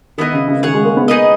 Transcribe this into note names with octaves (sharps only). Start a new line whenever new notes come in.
D#3 B3 E4 A#4 D#5
C#3
C#3
D#3 G#4 C#5 F#5
G#3
A#3
B3
A#3 D#4 G#4 B4 D#5